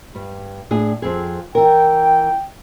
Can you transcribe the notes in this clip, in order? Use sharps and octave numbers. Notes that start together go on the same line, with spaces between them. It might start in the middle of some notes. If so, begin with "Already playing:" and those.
G2
A2 D4 G#4
F2 C4 G#4
E3 A#4 G5